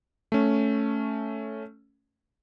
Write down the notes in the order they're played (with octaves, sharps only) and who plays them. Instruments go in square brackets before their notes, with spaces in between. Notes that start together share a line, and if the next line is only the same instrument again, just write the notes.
[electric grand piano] A3 C#4